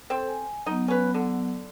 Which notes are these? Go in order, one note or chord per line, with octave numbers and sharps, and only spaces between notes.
C4 A4 C5
G#5
F#3 B3 D#4
C#4 B4
D3